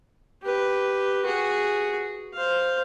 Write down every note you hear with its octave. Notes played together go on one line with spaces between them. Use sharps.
G4 B4
F#4 G#4
C5 F5